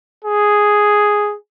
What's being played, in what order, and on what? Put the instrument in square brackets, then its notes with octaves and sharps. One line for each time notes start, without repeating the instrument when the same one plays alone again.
[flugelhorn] G#4